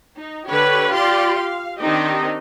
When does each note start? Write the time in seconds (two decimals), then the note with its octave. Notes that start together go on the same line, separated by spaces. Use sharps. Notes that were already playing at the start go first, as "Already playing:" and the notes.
0.18 D#4
0.48 D3 G4 B4 C#5
0.92 F4 G4 D5 C6
1.37 F5
1.80 D#3 C4 D4 D#4 G4 D#5